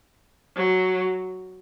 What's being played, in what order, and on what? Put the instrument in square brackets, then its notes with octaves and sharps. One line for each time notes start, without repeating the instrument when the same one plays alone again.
[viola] F#3